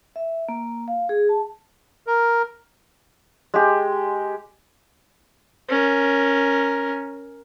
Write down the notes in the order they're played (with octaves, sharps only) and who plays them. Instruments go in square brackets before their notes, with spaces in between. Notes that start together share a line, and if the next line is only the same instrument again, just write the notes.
[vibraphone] E5
A#3
F5
G#4
A5
[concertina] A#4
[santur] G#3 G4
[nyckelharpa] C#4 A#4